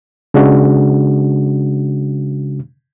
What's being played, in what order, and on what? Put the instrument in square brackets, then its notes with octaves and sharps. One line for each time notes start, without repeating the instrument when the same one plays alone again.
[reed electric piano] C#3 G#3 D4 F#4